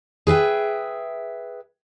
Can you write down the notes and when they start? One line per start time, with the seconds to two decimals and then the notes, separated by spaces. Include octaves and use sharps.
0.27 G#4 B4 E5 G5